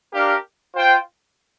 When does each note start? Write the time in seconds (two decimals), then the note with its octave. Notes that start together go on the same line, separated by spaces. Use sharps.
0.14 D4 G4 A#4 F5
0.75 F4 C5 G5